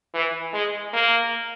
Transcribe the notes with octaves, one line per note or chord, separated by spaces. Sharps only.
E3
G#3
A#3